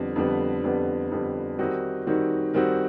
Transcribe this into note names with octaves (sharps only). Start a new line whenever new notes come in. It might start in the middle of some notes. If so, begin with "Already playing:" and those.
Already playing: F2 D3 G3 B3
F2 D3 G3 B3
F2 D3 G3 B3
F2 D3 G3 B3
D#3 G3 C4 D#4 F#4
D#3 G3 C4 D#4 F#4
D#3 G3 C4 D#4 F#4